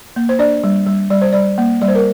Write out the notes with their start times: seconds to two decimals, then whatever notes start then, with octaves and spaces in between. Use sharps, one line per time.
0.16 A#3
0.29 C5
0.39 D4 D5
0.64 G3
0.87 G3
1.10 G3 D5
1.22 C5
1.33 G3 D5
1.58 A#3
1.81 G3 D5
1.88 C5
1.95 A#4